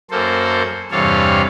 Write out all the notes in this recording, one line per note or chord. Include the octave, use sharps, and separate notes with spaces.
F#2 A#3 A4 C5
E2 G2 C3 A4 C#5 F5